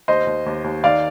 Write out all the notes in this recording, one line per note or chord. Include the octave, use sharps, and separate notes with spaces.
D#2 C5 D#5
D#2
D#2
D#2
D#3 D5 F5